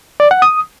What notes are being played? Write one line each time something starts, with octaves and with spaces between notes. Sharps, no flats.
D5
F#5
D#6